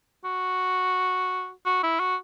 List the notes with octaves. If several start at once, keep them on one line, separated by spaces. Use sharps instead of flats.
F#4
F#4
E4
F#4